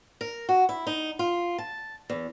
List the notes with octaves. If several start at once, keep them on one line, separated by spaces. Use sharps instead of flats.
A#4
F#4
E4
D#4
F4
A5
E2